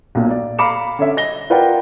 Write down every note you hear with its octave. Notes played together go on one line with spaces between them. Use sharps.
B1 A#2
D5
F5 A#5 B5 D6 C#7 E7
D3 C#4 E5
D#5 A#6 G7
F4 A#4 B4 D5 F#5 G5